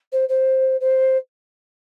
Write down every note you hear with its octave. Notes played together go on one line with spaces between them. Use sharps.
C5
C5
C5